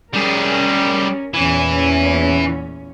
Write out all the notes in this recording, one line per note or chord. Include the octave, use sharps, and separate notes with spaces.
G3 C#4 G#4 A#4
E2 A#2 E3 C#4